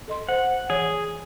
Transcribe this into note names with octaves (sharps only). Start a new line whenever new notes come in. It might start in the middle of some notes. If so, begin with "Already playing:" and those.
A4 D#5 C6
C5 F#5
E3 G#4 C#5